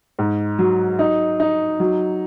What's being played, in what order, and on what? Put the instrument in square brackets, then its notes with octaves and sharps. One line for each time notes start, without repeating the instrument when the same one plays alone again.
[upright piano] G#2
F#3
D#4
D#4
F#3